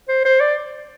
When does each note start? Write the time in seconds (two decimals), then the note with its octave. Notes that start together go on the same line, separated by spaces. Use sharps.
0.09 C5
0.25 C5
0.40 D5